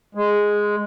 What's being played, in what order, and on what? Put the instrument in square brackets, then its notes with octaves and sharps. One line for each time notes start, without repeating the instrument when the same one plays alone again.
[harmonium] G#3